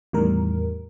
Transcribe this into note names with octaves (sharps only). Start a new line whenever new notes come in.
E2 A2 D#3 G3 A#4